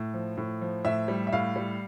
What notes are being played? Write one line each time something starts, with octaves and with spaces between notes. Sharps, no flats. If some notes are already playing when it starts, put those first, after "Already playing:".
Already playing: A2
F3
A2
F3
A2 E5
G3
E5
A2 F5
G3